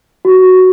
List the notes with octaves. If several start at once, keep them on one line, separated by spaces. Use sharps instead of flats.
F#4